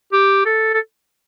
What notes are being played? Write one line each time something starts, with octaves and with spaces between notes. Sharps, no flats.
G4
A4
A4